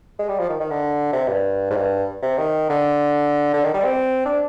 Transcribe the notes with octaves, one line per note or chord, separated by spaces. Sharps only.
G#3
G3
F3
D#3
D#3
D3
C3
G2
G#2
G2
C3
D#3
D3
D3
D#3
G3
C4
D4